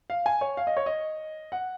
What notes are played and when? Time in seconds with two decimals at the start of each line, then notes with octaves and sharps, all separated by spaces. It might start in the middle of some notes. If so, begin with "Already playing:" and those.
0.10 F5
0.26 G#5
0.41 C#5
0.57 F5
0.67 D#5
0.77 C#5
0.86 D#5
1.52 F#5